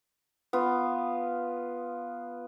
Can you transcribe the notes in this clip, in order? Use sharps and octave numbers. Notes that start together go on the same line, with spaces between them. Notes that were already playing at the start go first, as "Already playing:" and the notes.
B3 F4